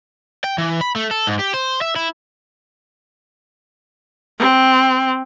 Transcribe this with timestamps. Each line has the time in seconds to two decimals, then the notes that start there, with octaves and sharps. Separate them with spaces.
0.44 G5
0.58 E3
0.81 B5
0.96 A3
1.11 A4
1.27 G#2
1.39 G4
1.54 C5
1.81 E5
1.96 E4
4.39 C4